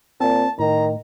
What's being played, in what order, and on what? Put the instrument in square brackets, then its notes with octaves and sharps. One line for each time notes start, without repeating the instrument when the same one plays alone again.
[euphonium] A#2 [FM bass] C4 [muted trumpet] A5
[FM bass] A2 [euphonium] D#3 [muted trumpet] A#5